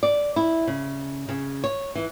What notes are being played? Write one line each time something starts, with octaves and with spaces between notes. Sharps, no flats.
D5
E4
C#3
C#3
C#5
E3